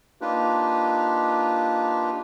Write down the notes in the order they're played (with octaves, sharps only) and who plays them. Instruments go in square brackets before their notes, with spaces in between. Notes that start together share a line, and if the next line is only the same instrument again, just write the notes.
[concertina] A#3 D4 D#4 F4 G4 B4